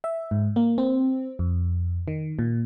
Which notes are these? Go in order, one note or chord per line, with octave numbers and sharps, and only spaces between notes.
E5
G#2
A#3
C4
F2
D#3
A#2